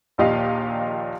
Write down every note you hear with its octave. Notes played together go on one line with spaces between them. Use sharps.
A#1 D#2 A#2 G4 D#5 F5